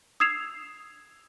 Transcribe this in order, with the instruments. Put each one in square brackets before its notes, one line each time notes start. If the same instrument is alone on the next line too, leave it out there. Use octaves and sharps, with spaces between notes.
[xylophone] D#6 E6 G#6 C7 E7 F7